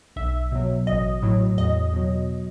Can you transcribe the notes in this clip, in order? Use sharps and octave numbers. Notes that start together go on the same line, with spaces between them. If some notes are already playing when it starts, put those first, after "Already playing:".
B1 E5
B2 F#3
A1 D#5
A2 F#3
E2 D#5
B2 F#3